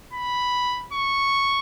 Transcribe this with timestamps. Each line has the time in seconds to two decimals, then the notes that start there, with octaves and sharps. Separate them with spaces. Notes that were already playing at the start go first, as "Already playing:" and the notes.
0.13 B5
0.93 C#6